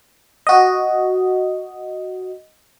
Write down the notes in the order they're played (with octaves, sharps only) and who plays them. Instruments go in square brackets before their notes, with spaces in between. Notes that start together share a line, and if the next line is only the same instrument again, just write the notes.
[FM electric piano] F#4 D#5